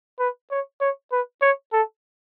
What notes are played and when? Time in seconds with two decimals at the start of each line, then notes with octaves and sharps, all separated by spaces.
0.19 B4
0.51 C#5
0.81 C#5
1.12 B4
1.42 C#5
1.73 A4